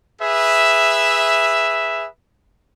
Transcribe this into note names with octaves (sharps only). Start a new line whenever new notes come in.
G#4 B4 E5